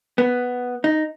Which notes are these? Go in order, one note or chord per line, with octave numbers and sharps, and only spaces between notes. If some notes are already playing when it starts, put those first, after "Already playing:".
B3
D#4